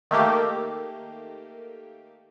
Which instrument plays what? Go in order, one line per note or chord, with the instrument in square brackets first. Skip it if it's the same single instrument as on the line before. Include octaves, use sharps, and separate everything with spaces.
[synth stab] D#3 A3 A#3 G4